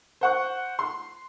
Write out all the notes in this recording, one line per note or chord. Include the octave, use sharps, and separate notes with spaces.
C5 F#5 C#6
C6